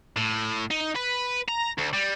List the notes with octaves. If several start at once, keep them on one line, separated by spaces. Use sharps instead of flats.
A2
D#4
B4
A#5
D2
G3